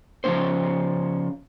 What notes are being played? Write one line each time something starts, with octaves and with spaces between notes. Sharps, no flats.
C#3 F3 G3 A#3 C#4 C5